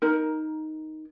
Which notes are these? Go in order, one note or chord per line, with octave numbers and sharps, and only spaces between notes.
D#4 A#4